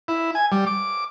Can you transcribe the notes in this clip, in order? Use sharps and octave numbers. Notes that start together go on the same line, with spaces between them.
E4
G#5
G3
D6